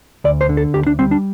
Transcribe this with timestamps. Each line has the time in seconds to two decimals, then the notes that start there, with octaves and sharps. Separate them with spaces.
0.24 D2 D5
0.41 C5
0.49 D3
0.57 A4
0.74 D2 G4
0.87 D4
0.99 G3 C4
1.11 D4